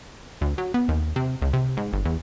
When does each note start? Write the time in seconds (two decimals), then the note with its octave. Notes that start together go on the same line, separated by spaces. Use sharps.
0.41 D2
0.58 F#3
0.74 B3
0.89 D#2
1.16 C3
1.42 C#2
1.53 C3
1.77 G#2
1.93 G1
2.05 E2